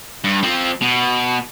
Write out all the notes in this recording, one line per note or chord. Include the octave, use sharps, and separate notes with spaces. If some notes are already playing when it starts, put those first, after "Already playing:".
G2
F3 C4
B2